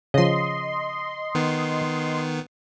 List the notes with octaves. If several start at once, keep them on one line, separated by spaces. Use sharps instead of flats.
C#3 F3 D#5 C6
D#3 B3